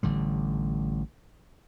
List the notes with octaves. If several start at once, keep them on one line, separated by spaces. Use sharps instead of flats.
A1 D3 G3